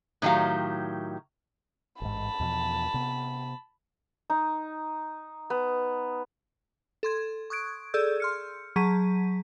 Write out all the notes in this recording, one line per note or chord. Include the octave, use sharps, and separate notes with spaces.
A2 D#3 F#3 G4 F5
A1 G#2 A5 B5
E2 B2 F3
C3 B3
D#4
B3
A4 C6 G#6
C#6 D#6 F#6 G#6 D7
G#4 A4 D5 E6 G6
C6 F6 C#7
F#3 G#4 A5 A#5 B6 D#7